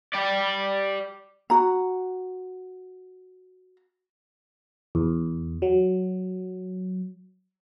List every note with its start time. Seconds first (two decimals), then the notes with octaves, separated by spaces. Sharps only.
0.13 G4 D5
1.50 F#4 A#5
4.95 E2
5.62 F#3